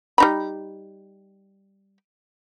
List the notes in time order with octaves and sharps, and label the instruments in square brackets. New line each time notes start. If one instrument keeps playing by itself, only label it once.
[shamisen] G3 D#4 B5